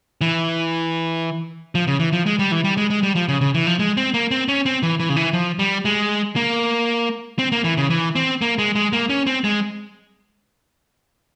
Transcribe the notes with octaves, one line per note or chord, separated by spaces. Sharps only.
E3
F3
C#3
E3
F3
G#3
G3
E3
G3
G#3
G#3
G3
F3
C#3
C#3
E3
F3
G#3
C4
A#3
C4
C#4
C4
E3
E3
C#3
E3
F3
G3
G#3
A#3
C4
A#3
E3
C#3
E3
C4
A#3
G#3
G#3
A#3
C#4
C4
G#3